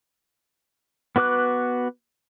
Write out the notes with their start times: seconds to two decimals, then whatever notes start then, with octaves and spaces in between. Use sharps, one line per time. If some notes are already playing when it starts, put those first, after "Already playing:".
1.16 B3 F#4 B4 D6 F#6